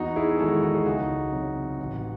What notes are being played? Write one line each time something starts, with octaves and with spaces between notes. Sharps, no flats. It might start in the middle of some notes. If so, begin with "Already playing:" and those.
Already playing: E2 D#4 F#4
E4 G#4
D#3 G#3 F#4 A4
D#4 F#4
G#4
C#2 D#4 F#4
C3 F#3
A1